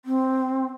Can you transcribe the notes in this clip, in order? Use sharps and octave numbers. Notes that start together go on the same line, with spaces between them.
C4